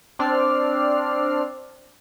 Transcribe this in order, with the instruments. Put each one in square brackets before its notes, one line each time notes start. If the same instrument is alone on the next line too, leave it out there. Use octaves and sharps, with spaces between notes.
[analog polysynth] C4 D4 D5 F6 C7